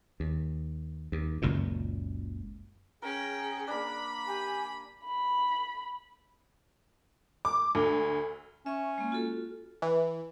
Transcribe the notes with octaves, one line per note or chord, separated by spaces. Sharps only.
D#2
D#2
F#1 C#2 F#2 A#2
C#4 G#4 A#4 G5
A#3 D4 B5
G4 G#5
B5
D6
D2
C#4 E5 C#6
G#3 A#3
F4 F#4 A4
E3